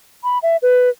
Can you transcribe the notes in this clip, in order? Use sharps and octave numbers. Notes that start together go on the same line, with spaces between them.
B5
E5
B4